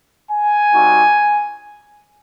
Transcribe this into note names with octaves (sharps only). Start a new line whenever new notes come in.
G#5
G3 C4 D#4 F#4